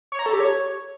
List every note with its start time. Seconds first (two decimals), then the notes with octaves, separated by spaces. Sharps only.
0.12 C#5
0.19 A#5
0.26 A4
0.33 G4
0.40 C#5